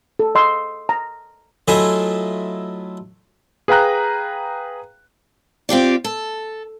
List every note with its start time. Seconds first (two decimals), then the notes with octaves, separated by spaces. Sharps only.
0.19 A4
0.35 D#5 C6 E6
0.89 A#5
1.68 F#3 A3 E4 F4 D#5 G#5
3.68 G#4 B4 F5 G5 A#5 F#6
5.69 C4 F4 G4 D5
6.04 A4